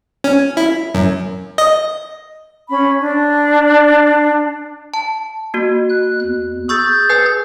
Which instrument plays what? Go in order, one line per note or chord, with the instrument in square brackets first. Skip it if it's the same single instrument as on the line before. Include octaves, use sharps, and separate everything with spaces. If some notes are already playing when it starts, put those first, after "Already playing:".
[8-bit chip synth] C#4
E4
F#2
D#5
[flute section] C#4 B5
D4
[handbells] A5
A#3 F#4
[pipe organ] F#6
E2
[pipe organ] G#4 G6 A6 [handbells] C#6 E6
[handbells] B4 G#5